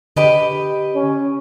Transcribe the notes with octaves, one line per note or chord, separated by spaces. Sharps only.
D3 G4 B4 D#5
C#4